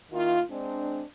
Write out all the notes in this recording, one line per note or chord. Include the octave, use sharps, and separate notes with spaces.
D#3 A#3 E4 F4
G#3 C4 D4